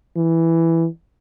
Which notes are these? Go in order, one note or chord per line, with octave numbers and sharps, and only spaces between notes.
E3